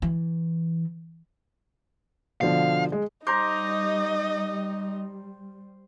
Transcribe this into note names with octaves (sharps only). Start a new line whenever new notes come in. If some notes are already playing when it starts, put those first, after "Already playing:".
E3
B2 D3 F3 F5
G#3
G3 D#4 C5 D#5 A#5 D6 G6